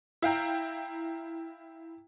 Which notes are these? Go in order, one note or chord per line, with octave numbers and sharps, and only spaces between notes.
E4 F5 G5 A#5